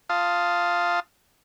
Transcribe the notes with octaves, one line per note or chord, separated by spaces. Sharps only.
F4 F5 A5 D#6